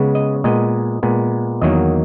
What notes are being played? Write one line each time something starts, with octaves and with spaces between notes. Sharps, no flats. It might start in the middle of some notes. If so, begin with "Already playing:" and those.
Already playing: C#3 G#3 B3
D#5
A#2 G#3 B3 D#5
A#2 G#3 B3
E2 D#3 F#3 A#3 D#5